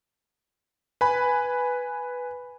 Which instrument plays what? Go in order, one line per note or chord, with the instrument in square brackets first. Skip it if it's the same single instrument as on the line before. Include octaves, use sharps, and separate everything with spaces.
[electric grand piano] B4 G#5 B5